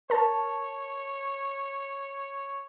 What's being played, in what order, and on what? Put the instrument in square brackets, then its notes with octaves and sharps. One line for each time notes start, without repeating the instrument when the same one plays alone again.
[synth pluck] A#4 A5 [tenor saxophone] C#5